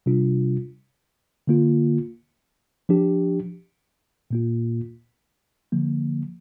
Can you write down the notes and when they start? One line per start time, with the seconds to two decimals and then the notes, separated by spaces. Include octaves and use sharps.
0.06 C3 G3 D4 F4
1.47 D3 A#3 F4
2.89 F3 D4 G4
4.31 A#2 A#3 F4
5.72 D3 F3 A#3